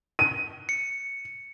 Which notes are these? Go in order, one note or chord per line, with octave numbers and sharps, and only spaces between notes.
D#7
C#7